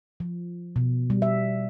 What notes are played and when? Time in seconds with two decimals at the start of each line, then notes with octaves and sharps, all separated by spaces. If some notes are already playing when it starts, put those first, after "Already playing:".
0.20 F3
0.76 B2
1.10 G3
1.22 E5